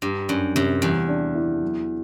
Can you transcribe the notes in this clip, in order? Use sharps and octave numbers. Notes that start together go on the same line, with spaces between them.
G2 G3
F#2 D4
F#2 C3
E2 G3
D4
E3
F#3